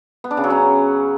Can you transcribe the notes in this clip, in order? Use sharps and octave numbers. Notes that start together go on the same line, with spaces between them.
B3
D4
C#3
F#3
C#4